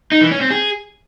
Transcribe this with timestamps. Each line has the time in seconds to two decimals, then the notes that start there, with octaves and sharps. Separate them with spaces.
0.12 D#4
0.21 E3
0.31 C#4
0.41 C4
0.51 G#4